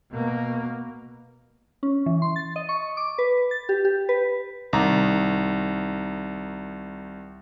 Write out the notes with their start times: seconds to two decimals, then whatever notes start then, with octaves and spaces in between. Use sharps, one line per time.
0.11 B2 A#3
1.83 C#4
2.06 E3
2.22 C6
2.36 A6
2.56 D#5
2.69 C#6
2.97 D6
3.18 B4
3.51 A6
3.69 G4
3.85 G4
4.09 B4
4.73 C2 D#3 A#5